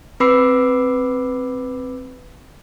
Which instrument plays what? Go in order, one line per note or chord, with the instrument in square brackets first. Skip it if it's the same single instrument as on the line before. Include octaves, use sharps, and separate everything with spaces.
[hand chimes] C4 B4 B5 D6 E6 C7